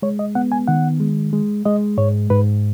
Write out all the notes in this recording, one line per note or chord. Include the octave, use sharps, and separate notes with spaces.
G#3 C#5
D#5
B3 F#5
G#5
D#3 F#5
G#3
G#3
G#3 D#5
G#2 C#5
G#2 B4